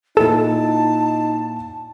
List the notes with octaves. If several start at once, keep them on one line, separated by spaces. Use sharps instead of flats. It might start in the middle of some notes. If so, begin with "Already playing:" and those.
A#2 D#4 E4 A4 A5 E7